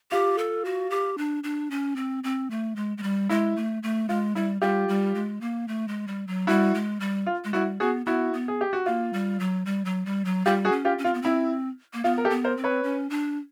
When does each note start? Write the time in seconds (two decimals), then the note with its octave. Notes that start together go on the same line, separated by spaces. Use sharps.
0.11 F4 G4
0.38 A4
0.65 F#4
0.90 G4
1.18 D4
1.44 D4
1.71 C#4
1.96 C4
2.24 C4
2.50 A3
2.76 G#3
2.98 G#3
3.03 G3
3.29 G#3 E4
3.56 A3
3.83 A3
4.09 G#3 F4
4.35 G3 E4
4.62 G3 F4 G4
4.88 G3
5.15 G#3
5.41 A#3
5.68 A3
5.88 G#3
6.07 G3
6.27 F#3
6.47 G3 E4 F#4
6.74 G#3
7.00 G3
7.26 F4
7.44 G#3
7.53 G3 E4 F#4
7.80 B3 F#4 G#4
8.06 B3 E4 F#4
8.33 B3
8.48 G#4
8.61 G4
8.73 F#4
8.86 A#3 F4
9.13 G3
9.40 F#3
9.66 G3
9.85 F#3
10.06 G3
10.25 F#3
10.45 G3 F4 G4
10.65 F#4 G#4
10.72 C#4
10.85 F4 G4
10.98 C#4
11.04 C4 F4
11.14 B3
11.22 C4 E4
11.94 A#3
12.04 B3 F4
12.18 A#4
12.25 G4 A4
12.30 B3
12.44 A#4 C5
12.57 C4
12.64 B4 C#5
12.83 C#4
13.10 D4